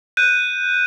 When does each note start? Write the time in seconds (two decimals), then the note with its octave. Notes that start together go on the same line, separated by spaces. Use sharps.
0.17 F#6 G6 D#7